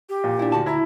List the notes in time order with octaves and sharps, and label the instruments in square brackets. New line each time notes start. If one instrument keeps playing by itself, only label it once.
[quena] G4
[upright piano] A#2
[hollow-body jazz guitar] D4 E4
D2 F#4 A5
[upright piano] E4 [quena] A#5